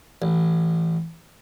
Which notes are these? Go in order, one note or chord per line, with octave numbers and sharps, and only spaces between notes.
A1